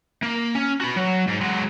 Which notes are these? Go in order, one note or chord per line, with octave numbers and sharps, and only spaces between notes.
A#3
C#4
F#4 B5
F#3
G#2
F#3 G#3